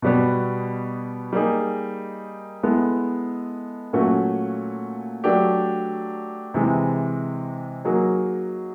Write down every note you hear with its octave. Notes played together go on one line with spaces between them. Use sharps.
B2 G3 B3
G3 A#3 D#4 G#4
G#3 B3 E4 A4
A#2 F#3 A3 C#4 F#4
F#3 A3 D4 G4
C3 E3 G#3
F#3 A#3 D#4 G#4